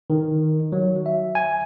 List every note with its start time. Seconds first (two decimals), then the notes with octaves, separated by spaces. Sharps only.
0.10 D#3
0.72 F#3
1.06 E5
1.35 G#5